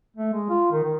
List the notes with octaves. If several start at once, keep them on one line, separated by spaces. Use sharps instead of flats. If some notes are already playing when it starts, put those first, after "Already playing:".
A3
G#3
F4
D#3
D#3